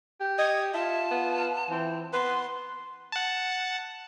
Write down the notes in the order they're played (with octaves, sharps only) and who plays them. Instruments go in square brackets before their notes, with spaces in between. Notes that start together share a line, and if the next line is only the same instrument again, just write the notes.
[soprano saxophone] G4
[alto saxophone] D#5 [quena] G#6
[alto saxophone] F4 [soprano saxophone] E5 [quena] A5
[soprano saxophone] B3
[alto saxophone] E3 [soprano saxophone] C4
[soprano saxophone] B3 [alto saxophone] B4 [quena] C6
[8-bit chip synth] F#5 A5